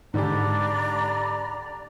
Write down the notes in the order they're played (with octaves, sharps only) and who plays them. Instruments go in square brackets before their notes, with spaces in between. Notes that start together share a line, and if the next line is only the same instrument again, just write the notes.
[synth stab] G#2 [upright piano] D3 G4 [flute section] D4 A#5 B5 [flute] D5